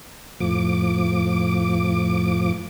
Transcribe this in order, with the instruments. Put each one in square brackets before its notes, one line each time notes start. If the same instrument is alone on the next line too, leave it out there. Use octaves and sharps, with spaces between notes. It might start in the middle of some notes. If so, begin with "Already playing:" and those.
[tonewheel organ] F2 A2 F3 D6